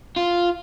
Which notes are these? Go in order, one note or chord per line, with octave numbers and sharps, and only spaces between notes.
F4